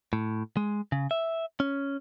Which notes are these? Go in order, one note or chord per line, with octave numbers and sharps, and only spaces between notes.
A2
G#3
C#3
E5
C#4